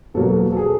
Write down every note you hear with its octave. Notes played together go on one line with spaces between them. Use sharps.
E2 B2 F#3 A#3 A4
A4
G#4